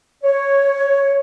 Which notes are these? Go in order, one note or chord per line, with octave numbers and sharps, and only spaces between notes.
C#5